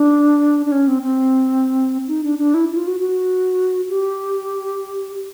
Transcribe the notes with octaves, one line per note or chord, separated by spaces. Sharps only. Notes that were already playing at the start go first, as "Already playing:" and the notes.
Already playing: D4
D4
C#4
C4
C4
D#4
D4
D4
E4
E4
F4
F#4
F#4
G4